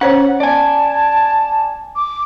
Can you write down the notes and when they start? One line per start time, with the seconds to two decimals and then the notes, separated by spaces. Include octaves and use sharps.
0.01 C#4 C5 C#5 F#5
0.40 D5 G#5 A5
1.96 D6